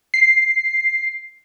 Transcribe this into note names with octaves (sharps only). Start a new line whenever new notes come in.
C7